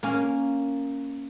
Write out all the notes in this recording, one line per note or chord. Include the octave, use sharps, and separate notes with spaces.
A#3 C#4 A#4